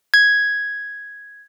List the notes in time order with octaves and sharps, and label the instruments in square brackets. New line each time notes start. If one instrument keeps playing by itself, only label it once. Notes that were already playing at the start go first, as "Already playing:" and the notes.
[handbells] G#6